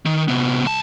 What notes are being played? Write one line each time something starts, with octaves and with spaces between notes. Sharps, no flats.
D#3
C3 B3
C2 A5